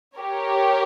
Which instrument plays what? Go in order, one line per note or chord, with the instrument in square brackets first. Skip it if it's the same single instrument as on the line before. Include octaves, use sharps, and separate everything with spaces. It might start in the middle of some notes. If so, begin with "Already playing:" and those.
[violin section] G4 A#4 C#5